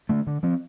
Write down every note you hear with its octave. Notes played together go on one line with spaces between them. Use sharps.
D3 A3
D3
F3 C4